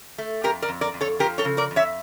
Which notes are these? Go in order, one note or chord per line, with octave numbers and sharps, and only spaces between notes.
A3
F2 G4 A#4
A#4 D5
F2
A#4 D5
F2
A4 C#5
F3 G4 A#4
A4 C#5
C#3
A#4 D5
F2
C#5 E5